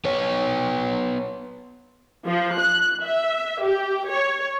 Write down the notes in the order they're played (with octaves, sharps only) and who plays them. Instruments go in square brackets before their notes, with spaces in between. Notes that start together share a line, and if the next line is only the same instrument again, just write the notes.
[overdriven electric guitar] B3 C#5
[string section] F3
F#6
E5
G4
C#5